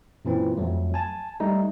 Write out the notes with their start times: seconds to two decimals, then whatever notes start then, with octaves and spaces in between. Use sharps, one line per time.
0.25 F#2 A#2 E3 C4
0.57 F2 F#3 A3
0.94 G#5 A5
1.40 G3 A3 D#4